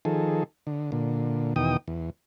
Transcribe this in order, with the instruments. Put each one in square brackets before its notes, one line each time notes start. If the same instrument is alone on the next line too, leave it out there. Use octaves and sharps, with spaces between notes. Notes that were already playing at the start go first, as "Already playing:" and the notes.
[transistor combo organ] D#3 F3 G#4 A4
D3
A#2 D3
E2 B2 D#3 G5 D#6
E2